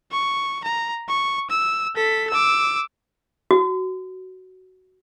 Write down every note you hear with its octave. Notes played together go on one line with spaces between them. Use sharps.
C#6
A#5
C#6
E6
A4 B6
D6 E6
F#4